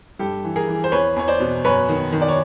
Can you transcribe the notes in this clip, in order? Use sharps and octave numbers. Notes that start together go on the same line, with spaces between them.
G2 G4 A4
E3
G#4 A#4
E3
C5
E2 B4 C#5
E2 C#5
C5 D5
B2
F#2 B4 C#5
D#3
D#3
D5
C#5